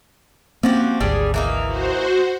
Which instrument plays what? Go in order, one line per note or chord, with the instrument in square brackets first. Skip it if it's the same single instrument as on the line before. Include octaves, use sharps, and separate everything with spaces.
[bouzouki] F3 F#4 G4 [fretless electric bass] A#3 C4 C#4
[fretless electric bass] G#1 D2 [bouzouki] G3 D4 G#4
[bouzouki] E3 A#3 D#4
[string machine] F#4 C5